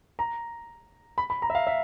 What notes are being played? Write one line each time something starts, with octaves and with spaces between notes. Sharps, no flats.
A#5
B5
B5
A#5
E5
F5
E5